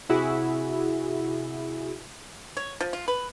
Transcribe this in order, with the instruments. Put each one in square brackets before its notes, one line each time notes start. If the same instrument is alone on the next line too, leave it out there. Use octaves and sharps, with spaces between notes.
[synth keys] C3 E4 F#4 G#4
[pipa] C#5
F3
F4
B4